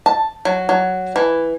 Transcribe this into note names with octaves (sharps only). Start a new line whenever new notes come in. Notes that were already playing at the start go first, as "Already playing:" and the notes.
A5
F#3
F#3
E3